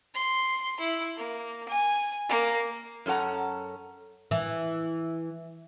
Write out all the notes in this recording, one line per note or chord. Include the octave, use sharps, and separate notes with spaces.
C6
E4
A#3
G#5
A#3
F#2 C#4 A4 F#5 A#5
E3